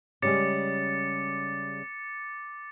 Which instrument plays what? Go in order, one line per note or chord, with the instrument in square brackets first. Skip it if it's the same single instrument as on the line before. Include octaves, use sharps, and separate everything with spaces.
[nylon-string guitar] C#3 G3 G#3 [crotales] D6 A6 C#7